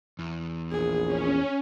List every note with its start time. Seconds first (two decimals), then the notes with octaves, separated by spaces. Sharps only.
0.19 E2
0.72 A#1 G#4
1.07 C#4